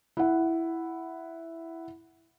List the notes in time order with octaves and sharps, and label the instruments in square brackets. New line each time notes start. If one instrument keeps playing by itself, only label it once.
[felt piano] E4 F#5